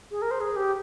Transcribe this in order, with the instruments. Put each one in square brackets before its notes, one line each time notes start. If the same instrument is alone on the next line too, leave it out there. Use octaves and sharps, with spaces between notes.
[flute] G#4
A#4
C5
G#4
G4